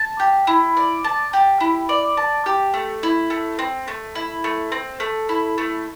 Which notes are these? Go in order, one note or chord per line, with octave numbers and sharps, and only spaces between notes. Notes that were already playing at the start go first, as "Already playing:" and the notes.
Already playing: A5
G4
E4
D5
A5
G4
E4
D5
A5
G4
A3
E4
A3
C4
A3
E4
A3
C4
A3
E4
A3